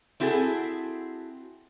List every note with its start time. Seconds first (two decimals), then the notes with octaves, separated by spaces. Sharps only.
0.20 C4 E4 F#4 G#4 A4